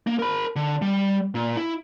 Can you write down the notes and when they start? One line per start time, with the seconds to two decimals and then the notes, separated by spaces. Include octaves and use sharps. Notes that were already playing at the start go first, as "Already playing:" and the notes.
0.07 A#3
0.19 A#4 B5
0.56 D3
0.82 G3
1.35 A#2
1.57 E4